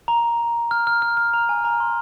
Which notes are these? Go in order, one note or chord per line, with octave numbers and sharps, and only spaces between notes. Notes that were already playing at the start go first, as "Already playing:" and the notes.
A#5
F6
F6
F6
F6
A#5
G#5
A#5
C6